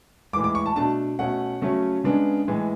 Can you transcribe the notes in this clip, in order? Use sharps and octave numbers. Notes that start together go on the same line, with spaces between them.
A2 E3 G#3 D6
D6
C#6
A5
B2 A3 D4 A5
B2 A3 C#4 F#5
C#3 F#3 A3 C#4
C#3 G#3 B3 D4
A2 E3 G#3